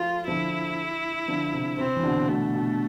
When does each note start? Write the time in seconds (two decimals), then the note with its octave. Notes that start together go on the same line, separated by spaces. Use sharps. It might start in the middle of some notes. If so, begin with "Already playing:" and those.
Already playing: F3 A3 F4
0.28 D3 F3 E4
1.28 D3 F3
1.53 C3
1.78 C3 C4
1.96 E3
2.03 B2 D3
2.28 B2 A3
2.54 B2